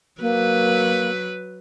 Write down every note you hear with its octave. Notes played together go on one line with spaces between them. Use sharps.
F#3 A#3 B4